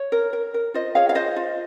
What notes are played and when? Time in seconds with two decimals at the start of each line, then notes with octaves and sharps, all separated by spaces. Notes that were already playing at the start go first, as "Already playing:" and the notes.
Already playing: C#5
0.12 A#4
0.33 A#4
0.54 A#4
0.74 F4 C5 D#5
0.95 G#4 C#5 F5
1.09 F5
1.15 F4 C5 D#5
1.36 F4